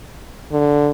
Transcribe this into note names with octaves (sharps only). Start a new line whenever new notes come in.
D3